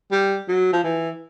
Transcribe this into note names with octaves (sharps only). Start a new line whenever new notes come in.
G3
F#3
F3
E3